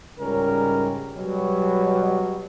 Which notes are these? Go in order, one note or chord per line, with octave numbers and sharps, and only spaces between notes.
C#2 G#2 C#3 G3 C#4 A#4
B2 F#3 G3